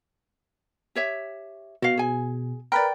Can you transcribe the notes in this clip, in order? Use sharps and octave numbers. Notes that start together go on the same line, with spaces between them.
G4 C#5 E5
B2 F#4 F5
G#4 G#5
A#4 B4 D5 G5